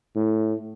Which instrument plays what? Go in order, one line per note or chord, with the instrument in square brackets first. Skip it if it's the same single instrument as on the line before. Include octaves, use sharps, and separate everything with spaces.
[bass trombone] A2